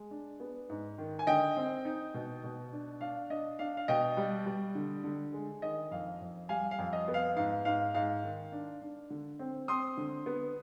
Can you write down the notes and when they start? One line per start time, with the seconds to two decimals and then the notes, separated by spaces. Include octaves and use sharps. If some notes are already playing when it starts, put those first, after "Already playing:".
Already playing: G#3
0.11 D4
0.40 B3
0.69 G#2
0.98 D#3
1.19 G#5
1.27 D3 D#5 G5
1.56 C4
1.85 D#4
2.14 B2
2.44 B2
2.72 D4
3.01 D4 F5
3.30 D4 D#5
3.59 D4 F5
3.77 F5
3.88 B2 D#5 G5
4.17 G3
4.46 G3
4.75 D3
5.04 D3
5.33 G#3
5.62 D#3 D#5
5.91 F2 F5
6.20 F2
6.49 G3 F5 G#5
6.71 F5
6.79 F2
6.93 D#5
7.08 B3
7.14 F5
7.36 G#2 F5
7.65 G#2 F5
7.94 G#2 F5
8.23 D#3
8.52 D4
8.82 D4
9.10 D3
9.39 C4
9.68 C4 C6 D#6
9.97 D3
10.26 B3